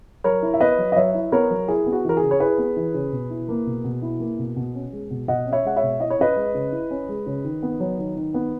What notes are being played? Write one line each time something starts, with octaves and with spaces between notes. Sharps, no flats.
F#3 A#4 C#5
E4
E5
B3 B4 D#5
F#3
D#5
F#3 C#5 E5
E4
B3 A#4 C#5
F#3
E4 G#4
B3
F#4
E3 A#4
G#4
C#3
C#5
E4 G#4 B4
B3
E3
C#3
B2
E4
A#3
B2
B2
E4
A#3
B2
B2
C#4
G#3
B2
B2 D#5 F#5
C#4
C#5 E5
G#3 F#5
C#5 E5
B2
E4 D#5
C#5
C#4 B4 D#5
G#3
C#3
E4
C#4
G#3
C#3
D#3
B3
F#3
D#3
D#3
B3